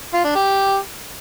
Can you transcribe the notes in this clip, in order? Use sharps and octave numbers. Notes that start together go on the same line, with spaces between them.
F4
D4
G4